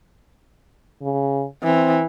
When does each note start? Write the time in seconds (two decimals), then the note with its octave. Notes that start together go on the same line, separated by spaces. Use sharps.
1.02 C#3
1.63 E3 C4